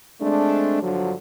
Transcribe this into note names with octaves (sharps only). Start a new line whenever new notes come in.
G#3 A3 C4 D4
G2 D3 F3 F#3